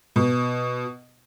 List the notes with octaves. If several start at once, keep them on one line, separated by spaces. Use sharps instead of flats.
B2